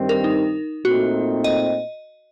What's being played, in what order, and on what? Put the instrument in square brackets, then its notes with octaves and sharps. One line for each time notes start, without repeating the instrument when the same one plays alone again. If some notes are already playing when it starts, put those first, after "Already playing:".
Already playing: [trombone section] G2 D#3 G3 C4
[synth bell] A#4
D#4
[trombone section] A#2 A3 C4 D#4 [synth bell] F#4
[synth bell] D#5